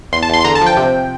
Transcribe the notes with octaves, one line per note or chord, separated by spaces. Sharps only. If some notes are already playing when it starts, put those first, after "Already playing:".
E2 C6
A5
E2 C6
C6
D3 A#5
A5
F3
G5
C3